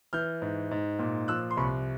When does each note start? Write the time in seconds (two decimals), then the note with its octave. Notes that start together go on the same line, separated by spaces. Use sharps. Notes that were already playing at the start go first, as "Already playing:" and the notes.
0.13 E3 F6 G6
0.42 G#2
0.71 G#2
0.99 A#2
1.28 F3 E6 F#6
1.51 C6
1.57 C2 B5 C#6